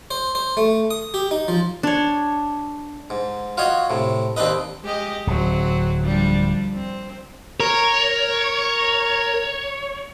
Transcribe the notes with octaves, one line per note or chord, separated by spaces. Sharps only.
C5
C5
A3
D#6
G4
D#4
F3
D4 C#5
G#2
F4 F#4 C#5 D#5
A2 C3
D#2 C4 D4 D#4 B4 D#5
G#3 G4 D#5
D1 F#3 C4
F3 G3 D4
C4
A#4 C#5